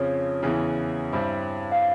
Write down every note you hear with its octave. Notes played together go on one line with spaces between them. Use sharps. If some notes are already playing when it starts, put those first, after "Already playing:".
Already playing: F2 C#3 F3 C#5
E2 C#3 E3
G2 G3 C4 E4
F5